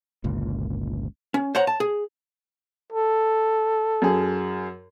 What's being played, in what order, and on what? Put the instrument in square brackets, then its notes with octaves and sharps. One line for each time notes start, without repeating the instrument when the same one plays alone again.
[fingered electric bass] G1 C#2 A#2
[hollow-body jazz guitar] C#4
C5 C#5 F#5 A#5
A5
G#4
[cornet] A4
[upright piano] F#2 G#4